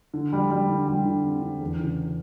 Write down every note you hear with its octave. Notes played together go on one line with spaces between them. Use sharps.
D3
G3
G3
D3
G3
D3
C4
D3
E2
C#3